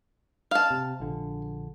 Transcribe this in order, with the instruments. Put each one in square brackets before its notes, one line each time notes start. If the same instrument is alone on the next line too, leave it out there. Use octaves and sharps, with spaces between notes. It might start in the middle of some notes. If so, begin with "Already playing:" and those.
[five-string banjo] F5 A5
[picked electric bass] C3
A#1 D3